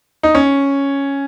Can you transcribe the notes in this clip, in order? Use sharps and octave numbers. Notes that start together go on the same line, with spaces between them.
D#4
C#4